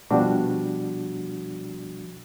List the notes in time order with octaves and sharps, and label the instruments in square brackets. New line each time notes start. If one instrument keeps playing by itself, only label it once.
[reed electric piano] B2 F3 G3 D4 F#4